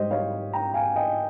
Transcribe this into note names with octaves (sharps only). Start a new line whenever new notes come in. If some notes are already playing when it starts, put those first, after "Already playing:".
Already playing: G#2 G3 G4 C5 D#5
C#5 F5
G5 A#5
F5 G#5
D#5 G5